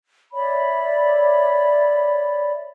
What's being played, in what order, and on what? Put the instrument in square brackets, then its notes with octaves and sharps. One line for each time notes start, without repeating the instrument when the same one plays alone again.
[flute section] C#5 D5 E5 B5